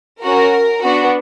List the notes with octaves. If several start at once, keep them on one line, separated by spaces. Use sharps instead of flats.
C#4 F#4 A#4
B3 D4 F#4